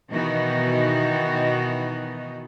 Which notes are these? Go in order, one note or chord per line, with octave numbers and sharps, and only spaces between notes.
B2 D#3 E3 B3 D#4 F#4